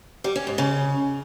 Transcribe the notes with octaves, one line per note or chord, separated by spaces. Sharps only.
G3
C#4
G#2
C#3